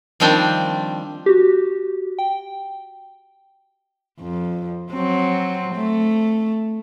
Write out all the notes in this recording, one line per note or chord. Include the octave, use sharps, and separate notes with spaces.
D#3 F3 G3 C4 D4
F#4 G4
G5
F2
F#3 C4
A3